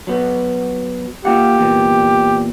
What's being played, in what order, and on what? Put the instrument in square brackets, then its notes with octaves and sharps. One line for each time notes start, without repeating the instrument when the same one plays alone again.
[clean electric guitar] F#3 B3
[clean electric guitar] A#3 F4 F#5 [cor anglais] G4
[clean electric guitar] E2 A#2